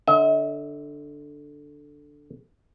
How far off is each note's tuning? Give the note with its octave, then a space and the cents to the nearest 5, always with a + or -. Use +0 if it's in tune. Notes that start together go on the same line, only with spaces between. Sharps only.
D3 +0 E5 -45